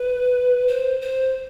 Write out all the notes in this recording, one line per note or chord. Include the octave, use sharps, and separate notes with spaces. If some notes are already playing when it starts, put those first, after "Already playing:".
Already playing: B4
C5
C5